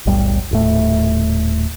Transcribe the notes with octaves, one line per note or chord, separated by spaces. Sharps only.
E1 B1 A2 G3
D#1 A2 A3